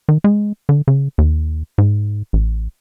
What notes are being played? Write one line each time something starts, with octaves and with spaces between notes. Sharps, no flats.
D#3
G#3
D3
C#3
D#2
G#2
A1